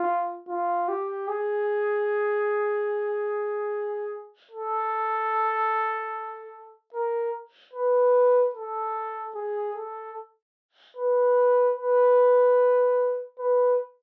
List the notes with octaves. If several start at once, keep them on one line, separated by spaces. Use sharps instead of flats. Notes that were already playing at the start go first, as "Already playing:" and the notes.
Already playing: F4
F4
G4
G#4
A4
A#4
B4
A4
G#4
A4
B4
B4
B4